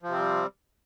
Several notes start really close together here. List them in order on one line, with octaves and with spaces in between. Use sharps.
F3 C3 C4 G3